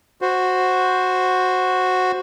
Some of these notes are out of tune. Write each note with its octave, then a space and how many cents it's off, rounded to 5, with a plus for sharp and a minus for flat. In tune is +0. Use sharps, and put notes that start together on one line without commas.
F#4 -5 C5 +0